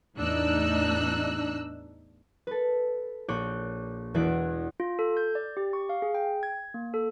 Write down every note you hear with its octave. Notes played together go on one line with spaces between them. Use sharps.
E2 A2 D4 D#4 E6 F#6
A4 B4
A#1 C#5 D6 F#6 G6
E1 E2 E5 F#6 D7
F4
A4
G6
D5
G4
C#6
F5
G#4
G5
G#6
A#3
A4